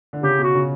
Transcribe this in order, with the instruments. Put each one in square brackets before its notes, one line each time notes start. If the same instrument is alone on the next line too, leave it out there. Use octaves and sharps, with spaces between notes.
[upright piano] D3
[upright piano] C#3 [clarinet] G4
[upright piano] B2 [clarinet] F#4
[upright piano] C#3